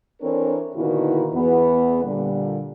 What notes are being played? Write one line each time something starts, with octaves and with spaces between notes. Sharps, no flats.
E3 C4 D4 A4 A#4 C#5
A#2 D3 D#3 B3 E4 F#4
E2 B3
A#2 D3 G3